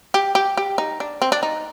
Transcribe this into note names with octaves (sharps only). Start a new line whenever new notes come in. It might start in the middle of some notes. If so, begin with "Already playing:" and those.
G4
G4
G4
D#4
D4
C4
D4
D#4